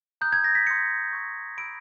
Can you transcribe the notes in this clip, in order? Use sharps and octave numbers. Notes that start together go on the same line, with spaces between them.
A#5 D#6 F#6 G6
G#6
A#6
B6
C6 D#6 F#6 C#7
C#6 E6 G6
B5 E6 G6 D7